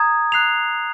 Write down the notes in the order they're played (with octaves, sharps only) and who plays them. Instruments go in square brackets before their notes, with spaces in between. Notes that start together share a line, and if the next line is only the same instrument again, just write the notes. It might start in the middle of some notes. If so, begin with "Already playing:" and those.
Already playing: [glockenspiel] A#5 D#6 G#6
F#6 C7 F7